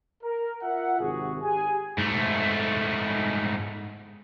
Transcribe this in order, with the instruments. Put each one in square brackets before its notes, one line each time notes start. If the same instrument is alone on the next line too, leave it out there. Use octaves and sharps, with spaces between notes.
[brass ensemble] A#4
F4 A#4 E5 F#5
G#1 C3 F#4 G#4
G4 G#4 G#5
[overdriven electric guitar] G#2 A3